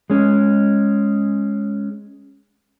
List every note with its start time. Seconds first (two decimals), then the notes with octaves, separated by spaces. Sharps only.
0.10 G#3 C#4